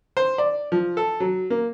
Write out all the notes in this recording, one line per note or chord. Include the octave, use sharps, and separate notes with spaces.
C5
D5
F3
A4
F#3
A#3